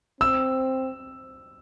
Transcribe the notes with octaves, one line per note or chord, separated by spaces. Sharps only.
C4 E6